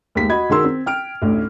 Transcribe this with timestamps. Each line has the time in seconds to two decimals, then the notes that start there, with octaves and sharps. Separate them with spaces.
0.15 D#2 G#3 A3 A4 B6
0.29 F#4 D#5 B5 G#6
0.50 D#3 F#4 G#4 A#4 C6 E6
0.64 C4
0.86 G5 F6 D7
1.22 A1 D2